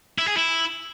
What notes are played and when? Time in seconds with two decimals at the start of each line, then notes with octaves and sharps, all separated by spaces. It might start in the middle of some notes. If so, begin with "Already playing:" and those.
0.18 E4
0.28 G#4
0.37 E4